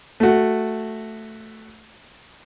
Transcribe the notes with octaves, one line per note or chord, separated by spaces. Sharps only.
A3 F#4